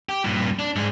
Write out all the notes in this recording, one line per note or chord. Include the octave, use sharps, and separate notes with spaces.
G4
G2 A#2
D4
G#2 G#4